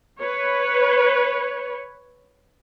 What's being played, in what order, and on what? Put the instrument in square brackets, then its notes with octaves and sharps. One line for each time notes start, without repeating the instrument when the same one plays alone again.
[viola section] B4 C#5